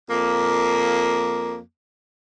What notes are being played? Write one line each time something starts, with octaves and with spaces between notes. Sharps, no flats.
F2 A#3